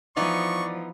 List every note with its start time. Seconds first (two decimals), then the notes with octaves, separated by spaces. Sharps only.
0.17 E3 F3 B3 D#4 D5 C#6